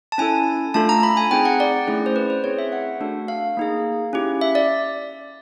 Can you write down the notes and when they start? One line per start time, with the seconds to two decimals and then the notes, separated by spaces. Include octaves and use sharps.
0.12 A5
0.18 C#4 E4 A4 G#5
0.74 A3 D4 F4 A4 A5
0.89 A#5
1.03 B5
1.17 G#5
1.31 C4 D#4 G#4 G5
1.45 F#5
1.60 D5
1.87 A3 C#4 E4 G#4
2.06 C5
2.16 B4
2.30 C5
2.44 C4 E4 G#4 C#5
2.59 E5
2.72 F#5
3.01 A3 D4 F#4 A4
3.28 F5
3.57 A#3 D#4 G#4
4.13 C#4 E4 G4
4.41 E5
4.55 D5